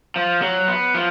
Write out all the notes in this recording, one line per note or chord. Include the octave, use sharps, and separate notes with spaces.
F3
F#3
B3
F3